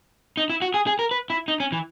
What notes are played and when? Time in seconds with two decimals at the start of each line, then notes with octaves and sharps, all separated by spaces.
0.37 D#4
0.50 E4
0.62 F#4
0.74 G#4
0.87 G#4
0.99 A#4
1.11 B4
1.30 E4
1.48 D#4
1.60 C#4
1.72 E3